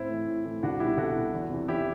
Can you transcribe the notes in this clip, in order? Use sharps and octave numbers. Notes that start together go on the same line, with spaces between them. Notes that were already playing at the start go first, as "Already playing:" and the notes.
Already playing: A2 C4 E4
E3 A3
A2
E3 A3
C2 D4 F#4
B2 G3 E4 G4
C2 F#4 A4
B2 G3
E2
C3 E3
E2 E4 G4